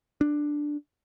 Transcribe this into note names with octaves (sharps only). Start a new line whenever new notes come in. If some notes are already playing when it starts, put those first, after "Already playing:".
D4